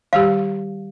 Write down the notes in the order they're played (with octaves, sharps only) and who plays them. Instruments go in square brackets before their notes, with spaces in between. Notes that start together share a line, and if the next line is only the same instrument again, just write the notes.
[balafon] D#3 G3 G4 [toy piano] F5